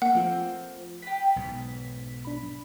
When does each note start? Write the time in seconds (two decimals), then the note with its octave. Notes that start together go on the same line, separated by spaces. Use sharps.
0.02 A#3 F#5
0.15 F3 A3 A#3 C4 F4 C5
1.02 G4 B4 B6
1.36 B1 G#2 B3
2.25 D4 B5